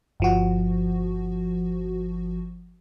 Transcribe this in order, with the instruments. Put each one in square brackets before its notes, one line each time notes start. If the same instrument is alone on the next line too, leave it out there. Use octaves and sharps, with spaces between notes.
[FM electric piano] G1 F3 F#4